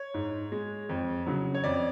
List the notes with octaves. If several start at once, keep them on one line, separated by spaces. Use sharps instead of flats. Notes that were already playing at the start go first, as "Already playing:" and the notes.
Already playing: C#5
G#2
G#3
F2
C#3 F#3
C#5
F2 D5